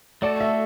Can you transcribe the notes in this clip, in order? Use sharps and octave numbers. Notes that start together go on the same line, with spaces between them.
A3 F#4 A4 D5
E5